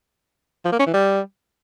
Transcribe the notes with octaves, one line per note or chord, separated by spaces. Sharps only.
F3
A#3
C#4
E3
G3